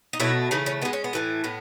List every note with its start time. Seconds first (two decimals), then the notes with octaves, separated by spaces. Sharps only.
0.13 D#4
0.20 B2 F#3 A3 E4
0.51 C#3 E3 A3 D#4
0.66 C#4
0.82 D#3 G#3 B3
0.93 C#4
1.04 B3
1.13 A2 E3 A3
1.44 A2 B3